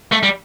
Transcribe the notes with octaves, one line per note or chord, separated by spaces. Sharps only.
A3
G3